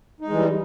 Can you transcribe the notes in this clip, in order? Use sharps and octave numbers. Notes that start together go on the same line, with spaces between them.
E3 G3 G#3 D#4